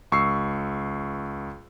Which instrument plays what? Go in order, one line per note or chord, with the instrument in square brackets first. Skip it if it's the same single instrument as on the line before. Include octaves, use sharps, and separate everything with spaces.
[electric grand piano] C#2 C#6 E6 C7